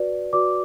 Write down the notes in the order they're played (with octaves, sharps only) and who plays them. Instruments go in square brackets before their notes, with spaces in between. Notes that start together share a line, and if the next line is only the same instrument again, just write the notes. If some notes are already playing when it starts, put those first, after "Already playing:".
Already playing: [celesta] F#4 B4 D5
F#4 B4 D5 D6